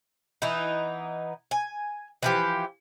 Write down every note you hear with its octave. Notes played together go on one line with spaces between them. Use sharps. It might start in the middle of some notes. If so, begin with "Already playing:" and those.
E3 B3 D#4
G#5
E3 F3 G4